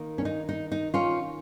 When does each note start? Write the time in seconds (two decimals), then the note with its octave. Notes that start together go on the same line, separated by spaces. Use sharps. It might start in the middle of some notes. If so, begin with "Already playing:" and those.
Already playing: D#3 A#3
0.18 C#4
0.25 D#4
0.49 D#4
0.72 D#4
0.94 C#4 F4